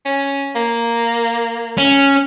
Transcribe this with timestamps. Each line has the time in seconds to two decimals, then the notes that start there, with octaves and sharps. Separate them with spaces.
0.05 C#4
0.55 A#3
1.78 C#4